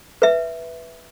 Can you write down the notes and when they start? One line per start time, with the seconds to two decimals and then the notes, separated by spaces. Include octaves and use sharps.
0.22 B4 E5